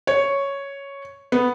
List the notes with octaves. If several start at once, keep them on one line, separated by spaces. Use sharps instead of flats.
C#5
B3